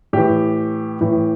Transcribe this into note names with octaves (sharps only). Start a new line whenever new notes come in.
A2 E3 G4
A2 E3